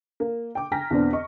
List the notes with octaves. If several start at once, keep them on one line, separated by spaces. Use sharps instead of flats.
A#3
G5 D6
G5 G#5 A#5 F6 A#6 B6
E2 B2 D3 B3 C4 D4
D#5 C#6